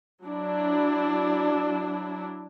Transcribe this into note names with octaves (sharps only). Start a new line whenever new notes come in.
F#3 D4 E4